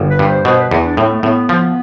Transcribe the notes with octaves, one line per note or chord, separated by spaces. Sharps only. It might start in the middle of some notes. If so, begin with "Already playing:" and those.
Already playing: G1
B4
G2
C5
B2 C5
B4
E2
D4
A2 C4
B3
A3
A2 B3
F3